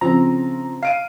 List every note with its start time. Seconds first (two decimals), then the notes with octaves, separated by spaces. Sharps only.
0.01 C#3 F3 C4 A#5
0.83 F5 C7 D7 D#7